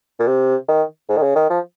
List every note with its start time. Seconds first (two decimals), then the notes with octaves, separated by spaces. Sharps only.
0.20 A#2
0.27 C3
0.68 D#3
1.09 G#2
1.17 D#3
1.22 C#3
1.36 D#3
1.50 F3